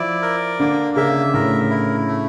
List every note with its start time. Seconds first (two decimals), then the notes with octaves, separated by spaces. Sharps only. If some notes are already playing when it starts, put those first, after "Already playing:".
Already playing: F3 E4 D5
0.22 A#4
0.60 D3 A#3
0.96 C#3 E5
1.34 A2 A#4
1.70 E4
2.08 A3